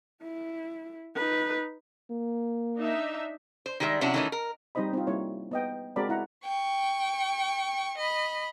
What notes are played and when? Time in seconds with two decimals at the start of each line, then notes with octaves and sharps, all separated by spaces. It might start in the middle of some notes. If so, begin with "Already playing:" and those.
0.23 E4
1.16 D#4 B4
2.11 A#3
2.76 D4 D#4 E5
3.66 C5
3.80 D#3 G3 G#3 B4 E5
4.01 C3 F#3 C#4 D4 E4 F#4
4.14 D#3 E3 F#3 A3 C#4 D#4
4.32 A#4
4.75 G3 C4 D#4 C5 D#5 B5
4.93 C4 D#4 F4
5.07 G3 A#3 E4 C#5
5.51 B3 D#5 G5
5.96 G#3 C4 F#4 A#4 D5 B5
6.09 E4 F#5 A#5
6.44 G5 C#6
7.98 D#5 B5